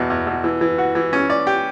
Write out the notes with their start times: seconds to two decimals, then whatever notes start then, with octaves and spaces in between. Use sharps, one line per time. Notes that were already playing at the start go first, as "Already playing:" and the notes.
Already playing: E2 B2
0.10 E2
0.27 B2
0.44 E3
0.61 E3
0.78 F#4
0.95 E3
1.13 C#4
1.30 D5
1.47 G4